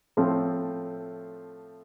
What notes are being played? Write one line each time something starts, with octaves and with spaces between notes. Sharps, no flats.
A2 F3 A3 C4